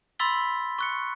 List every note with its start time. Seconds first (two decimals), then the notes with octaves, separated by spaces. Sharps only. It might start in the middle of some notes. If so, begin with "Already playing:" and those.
0.19 B5 C6 E6 A6 B6 G7
0.79 C#6 F#6 C#7